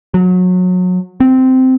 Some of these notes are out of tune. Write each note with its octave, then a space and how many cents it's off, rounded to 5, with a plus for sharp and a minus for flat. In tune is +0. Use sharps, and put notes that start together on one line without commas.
F#3 -25
C4 -10